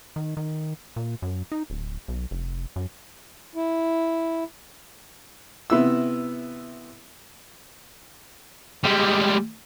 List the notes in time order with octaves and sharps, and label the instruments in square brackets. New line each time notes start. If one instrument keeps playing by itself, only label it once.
[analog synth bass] D#3
D#3
A#2
F#2
D#4
D1
B1
F1
F#2
[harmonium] E4
[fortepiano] C3 B3 E4 E6
[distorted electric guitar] G3 G#3